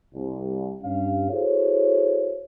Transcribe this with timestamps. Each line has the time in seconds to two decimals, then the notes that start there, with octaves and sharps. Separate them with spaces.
0.15 C2
0.84 G2 C#4 F5
1.31 E4 F#4 G#4 A4 C5 C#5